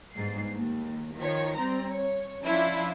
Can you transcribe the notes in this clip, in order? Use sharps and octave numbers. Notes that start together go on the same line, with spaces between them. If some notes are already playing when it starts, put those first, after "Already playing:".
G1 G#2 C7
D#2
D#3 F3 C#5
G3 C4 A#5
C#5
F3 C#4 D4 E4 F4